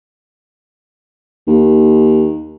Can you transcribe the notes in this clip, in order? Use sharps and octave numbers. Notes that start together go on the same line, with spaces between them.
D#2